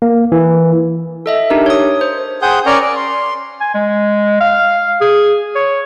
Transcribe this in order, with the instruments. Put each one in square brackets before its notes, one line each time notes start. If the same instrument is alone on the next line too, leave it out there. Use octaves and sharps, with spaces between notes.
[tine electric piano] A#3
E3
[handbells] A4 D#5 E5
D4 D#4 G4 A#4
C#5 D#6
C5
[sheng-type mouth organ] G#4 C5 F#5 G5 D#6 G6
C#4 A#4 D5 G#5 A#5 C#6
D5
C6
[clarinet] G#5
G#3
F5
G#4
C#5